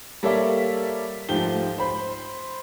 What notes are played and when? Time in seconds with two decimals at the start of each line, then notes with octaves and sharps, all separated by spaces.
0.23 G3 A#3 A4 C#5 D5 E5
1.29 G#2 F3 A3 G4 G7
1.78 C5 B5